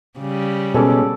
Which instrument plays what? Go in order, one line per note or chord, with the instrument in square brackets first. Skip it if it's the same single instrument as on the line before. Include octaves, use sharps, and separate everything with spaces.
[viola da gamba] C#3 G3
[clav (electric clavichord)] B2 [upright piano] G#3 C#4 [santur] A4 D6